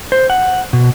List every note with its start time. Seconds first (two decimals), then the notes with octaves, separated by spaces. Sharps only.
0.12 C5
0.30 F#5
0.73 B2